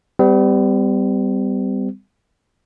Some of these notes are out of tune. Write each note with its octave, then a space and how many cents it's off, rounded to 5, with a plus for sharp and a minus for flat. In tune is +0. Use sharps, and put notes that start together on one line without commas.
G3 +5 C4 -45